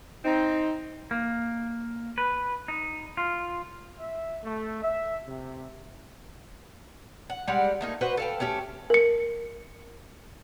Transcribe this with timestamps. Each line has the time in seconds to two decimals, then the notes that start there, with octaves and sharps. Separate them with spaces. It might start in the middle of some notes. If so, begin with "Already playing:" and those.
0.25 C4 D#4
1.11 A#3
2.18 B4
2.68 D#4
3.17 F4
3.99 E5
4.44 A3
4.82 E5
5.26 C3
7.30 F#5
7.47 G3 G#3 D5 F#5
7.81 A3 A#3 D#4
8.01 F#4 B4 C5
8.17 A4 F5 G5
8.40 A3 C#4 G4 A4
8.90 A#4 C#7